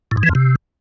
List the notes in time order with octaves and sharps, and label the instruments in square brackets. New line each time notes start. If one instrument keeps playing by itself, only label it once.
[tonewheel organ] A2
G#2
E3
F2
C3